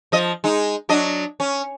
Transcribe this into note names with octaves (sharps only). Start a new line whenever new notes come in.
F3 D#5
G#3 D#4
F#3 D4 D#5
C#4